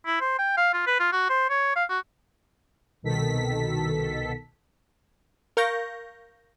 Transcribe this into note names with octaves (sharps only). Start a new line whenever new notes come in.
E4
C5
G5
F5
F4
B4
F4
F#4
C5
C#5
F5
F#4
C2 B2 D#3 A4 B6
A#4 F5 C#6 G6 A#6